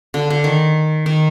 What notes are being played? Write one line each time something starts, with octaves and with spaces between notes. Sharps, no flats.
D3
D3
D#3
D#3